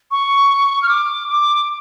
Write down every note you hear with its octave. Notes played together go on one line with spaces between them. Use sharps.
C#6
F6
D6
D6